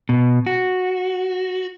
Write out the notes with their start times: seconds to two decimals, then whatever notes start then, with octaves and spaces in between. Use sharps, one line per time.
0.09 B2
0.46 F#4